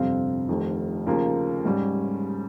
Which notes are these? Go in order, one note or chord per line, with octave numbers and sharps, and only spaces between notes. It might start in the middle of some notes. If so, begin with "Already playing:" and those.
Already playing: G1 F2 C3 G3 C4 F5
F1 F2 D#3
D#2 C#3 F3 A#3
G#2 G3 C#4